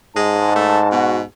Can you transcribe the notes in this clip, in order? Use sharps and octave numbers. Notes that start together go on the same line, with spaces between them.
G#2 G#3 A5
A3
B2 F#4